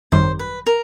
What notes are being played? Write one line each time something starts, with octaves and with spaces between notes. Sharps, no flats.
G#1 F#2 D#3 G3 C5
B4
A#4